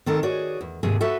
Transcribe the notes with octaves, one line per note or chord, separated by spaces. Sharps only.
D#3 C4 A4 A#4
F#4 G#4 C#5 D5
E2
D#2 G#2 C3 G#4
F#4 A4 B4 E5